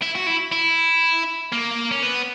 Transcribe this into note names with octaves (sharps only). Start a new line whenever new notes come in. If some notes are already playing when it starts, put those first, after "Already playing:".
E4
F#4
E4
E4
A#3
C#4
B3